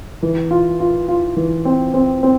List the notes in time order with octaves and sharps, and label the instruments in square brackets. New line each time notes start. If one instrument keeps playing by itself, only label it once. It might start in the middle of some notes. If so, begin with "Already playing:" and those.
[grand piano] E3
F4
F4
F4
E3
C4
C4
C4